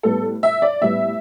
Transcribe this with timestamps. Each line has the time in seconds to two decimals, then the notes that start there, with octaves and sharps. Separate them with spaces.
0.03 A2 G3 B3 A4
0.43 E5
0.62 D5
0.82 A2 G3 B3 E5